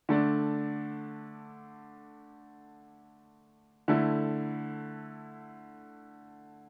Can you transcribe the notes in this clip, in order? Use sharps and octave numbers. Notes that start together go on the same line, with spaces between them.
D3 A3 D4
D3 A3 E4